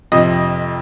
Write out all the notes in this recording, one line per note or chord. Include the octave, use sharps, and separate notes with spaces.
F2 C3 F3 D#5